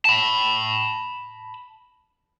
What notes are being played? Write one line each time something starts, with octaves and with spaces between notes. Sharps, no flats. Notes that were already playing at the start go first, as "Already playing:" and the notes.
A5 B5